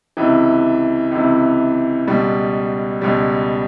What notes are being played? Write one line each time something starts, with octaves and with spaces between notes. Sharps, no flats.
C#2 C3 E3
C#2 C3 E3
C#2 B2 G3
C#2 B2 G3